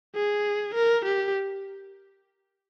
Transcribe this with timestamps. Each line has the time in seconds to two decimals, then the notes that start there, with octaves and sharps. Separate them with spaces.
0.15 G#4
0.74 A#4
1.05 G4